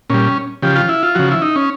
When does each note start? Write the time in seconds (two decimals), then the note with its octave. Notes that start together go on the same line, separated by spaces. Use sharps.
0.10 A#2 G3 C#4
0.62 C#3 F3 G4
0.76 F4
0.89 E4
1.03 F4
1.15 C#3 F3 F#4
1.32 E4
1.42 D#4
1.56 C#4